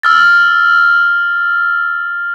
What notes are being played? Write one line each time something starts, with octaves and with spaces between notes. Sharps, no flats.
E6 F6 A6